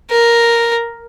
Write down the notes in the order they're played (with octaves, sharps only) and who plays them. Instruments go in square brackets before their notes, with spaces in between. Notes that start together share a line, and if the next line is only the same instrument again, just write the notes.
[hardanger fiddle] A#4